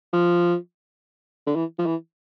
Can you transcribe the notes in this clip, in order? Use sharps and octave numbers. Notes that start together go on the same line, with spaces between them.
F3
D3
E3
F3
E3